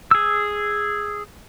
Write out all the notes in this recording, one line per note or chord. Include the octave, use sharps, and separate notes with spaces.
G#4 E6